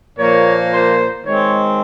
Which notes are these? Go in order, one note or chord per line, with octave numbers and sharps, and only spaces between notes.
A#2 F3 A#3 C#5
C5
D#3 G#3 C4 C#5